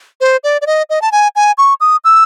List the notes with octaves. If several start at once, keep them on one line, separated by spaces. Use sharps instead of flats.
C5
D5
D5
D#5
D#5
A5
G#5
G#5
C#6
D#6
E6